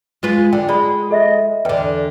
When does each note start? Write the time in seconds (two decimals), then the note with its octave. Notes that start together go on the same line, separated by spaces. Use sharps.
0.23 G#3 F4 B4
0.53 D3 G5
0.69 G#3 D5 B5
1.11 A4 D#5 E5
1.65 E2 D3 B4 G5